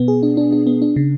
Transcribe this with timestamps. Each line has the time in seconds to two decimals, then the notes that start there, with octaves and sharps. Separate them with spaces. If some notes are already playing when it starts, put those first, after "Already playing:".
Already playing: B2 B3
0.08 G#4
0.23 D4
0.37 D4
0.52 D4
0.67 B3
0.82 D4
0.96 C#3